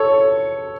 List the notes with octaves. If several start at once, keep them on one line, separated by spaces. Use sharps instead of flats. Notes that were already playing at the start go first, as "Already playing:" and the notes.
Already playing: A4 C#5